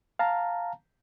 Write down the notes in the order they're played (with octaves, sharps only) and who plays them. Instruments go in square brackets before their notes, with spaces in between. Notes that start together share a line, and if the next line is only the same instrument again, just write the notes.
[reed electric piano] F5 A5 A#5